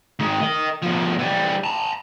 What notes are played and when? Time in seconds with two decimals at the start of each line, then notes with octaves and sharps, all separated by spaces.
0.19 D#3 G#3
0.41 A#4 D#5
0.83 B2 F3
1.19 E3 G3
1.64 A5 A#5